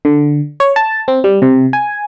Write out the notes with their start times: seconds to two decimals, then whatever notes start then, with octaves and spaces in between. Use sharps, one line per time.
0.05 D3
0.60 C#5
0.76 A5
1.08 C4
1.24 G3
1.42 C3
1.73 G#5